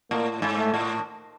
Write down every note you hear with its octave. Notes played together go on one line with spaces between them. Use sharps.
A2 A#3
G#2
A3
A2